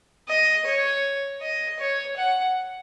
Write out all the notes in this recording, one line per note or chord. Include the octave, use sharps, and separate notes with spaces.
D#5
C#5
D#5
C#5
F#5